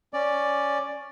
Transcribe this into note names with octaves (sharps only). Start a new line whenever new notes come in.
C#4 D5